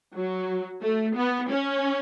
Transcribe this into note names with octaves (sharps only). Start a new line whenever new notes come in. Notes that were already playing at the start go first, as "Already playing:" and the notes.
F#3
A3
B3
C#4